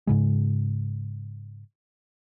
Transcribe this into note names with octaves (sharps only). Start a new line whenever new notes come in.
G#2 C#3 G#3